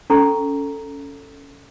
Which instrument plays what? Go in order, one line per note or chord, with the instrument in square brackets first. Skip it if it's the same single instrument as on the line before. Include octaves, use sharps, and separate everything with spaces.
[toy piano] C#4 A4 A#5 C#6